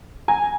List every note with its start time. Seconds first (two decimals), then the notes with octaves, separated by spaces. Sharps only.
0.28 G#5 A#5